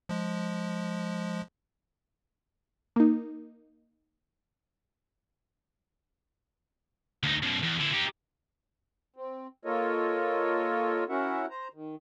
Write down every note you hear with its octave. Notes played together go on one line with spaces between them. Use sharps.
F3 G#3
A#3 D#4
D2 D#4
F#2 B2
E2
D3 E4
D#4 G4
C4
A#3 F4 A4 A#4 C#5 D#5
C#4 E4 F#4 A#4 E5 F#5
C5 A#5
D#3